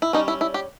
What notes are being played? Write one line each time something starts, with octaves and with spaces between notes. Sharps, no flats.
E4
G3 C#4 D#4
E4
E4
G4